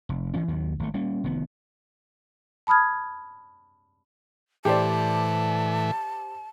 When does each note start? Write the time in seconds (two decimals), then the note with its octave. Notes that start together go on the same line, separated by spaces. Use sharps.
0.09 F1
0.34 D#3 E3 A3 C#4
0.48 D#2 D#3 F#3
0.79 G#1 A3
0.94 G3 A#3 C#4
1.24 F1 D#3 B3
2.67 A5 B5 D#6 F6 G#6
4.65 A2 E3 G4 C5 D5 A5